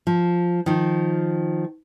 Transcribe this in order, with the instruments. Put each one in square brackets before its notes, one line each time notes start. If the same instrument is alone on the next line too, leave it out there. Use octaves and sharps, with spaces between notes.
[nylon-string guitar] F3
D#3 F3